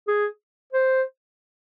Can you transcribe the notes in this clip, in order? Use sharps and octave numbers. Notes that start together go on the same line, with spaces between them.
G#4
C5